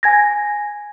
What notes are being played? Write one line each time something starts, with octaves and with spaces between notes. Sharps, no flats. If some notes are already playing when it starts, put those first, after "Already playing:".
G#5 G#6 A#6